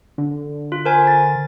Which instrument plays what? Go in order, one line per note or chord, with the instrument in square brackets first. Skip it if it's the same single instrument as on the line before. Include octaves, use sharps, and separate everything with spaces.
[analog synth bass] D3
[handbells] F4
A#4 C5 G#5
A6